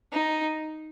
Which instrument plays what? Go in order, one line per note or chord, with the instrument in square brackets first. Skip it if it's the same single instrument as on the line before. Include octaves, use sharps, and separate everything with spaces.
[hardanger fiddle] D#4